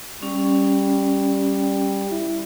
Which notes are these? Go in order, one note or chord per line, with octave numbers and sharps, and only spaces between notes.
G3 C#4
E4